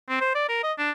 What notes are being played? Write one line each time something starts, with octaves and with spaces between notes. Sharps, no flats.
C4
C5
D5
A#4
D#5
D4